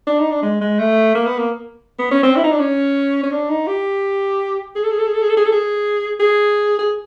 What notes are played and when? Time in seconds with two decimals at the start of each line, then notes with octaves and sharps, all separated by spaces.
0.07 D4
0.19 D#4
0.31 D4
0.43 G#3
0.61 G#3
0.79 A3
1.15 A#3
1.27 B3
1.39 A#3
1.99 B3
2.11 C#4
2.23 C4
2.36 E4
2.44 D#4
2.52 D4
2.59 C#4
3.23 C#4
3.31 D4
3.49 D#4
3.67 G4
4.76 G#4
4.83 A4
4.91 G#4
4.99 A4
5.06 G#4
5.14 A4
5.22 G#4
5.30 A4
5.37 G#4
5.45 A4
5.52 G#4
6.20 G#4
6.79 G#4